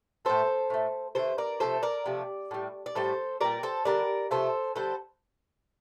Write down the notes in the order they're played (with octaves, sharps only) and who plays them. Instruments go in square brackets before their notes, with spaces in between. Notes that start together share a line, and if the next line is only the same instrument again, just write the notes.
[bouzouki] A2 A3 A4 C5
A2 A3
D3 A3 A4 C5
A#4 D5
C3 F3 A3 A4 C5
A#4 D5
C3 F3 A3
A2 G3
D5
A2 G3 A4 C5
A#2 G3 A#4 D5
A4 C5
D3 G3 A#4 D5
C3 F3 A3 A4 C5
D3 G3 A4 C5